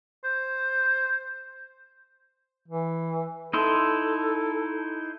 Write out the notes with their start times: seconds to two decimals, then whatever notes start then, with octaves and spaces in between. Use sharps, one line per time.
0.24 C5
2.68 E3
3.53 D#4 E4 A4 C6